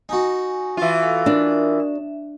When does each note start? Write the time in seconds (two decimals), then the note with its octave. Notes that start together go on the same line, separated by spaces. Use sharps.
0.09 D#4 F#4 G#5
0.77 E3 F4
1.02 A4 F5
1.26 D4 A#4 D#6
1.80 E5